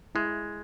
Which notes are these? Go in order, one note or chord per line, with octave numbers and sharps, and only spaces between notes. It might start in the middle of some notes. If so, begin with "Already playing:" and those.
G#3 E4